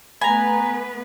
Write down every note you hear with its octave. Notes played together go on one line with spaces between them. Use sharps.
A3 B3 B4 G#5 A#5 B5